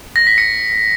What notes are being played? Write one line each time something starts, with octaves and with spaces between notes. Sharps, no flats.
A#6
B6
C#7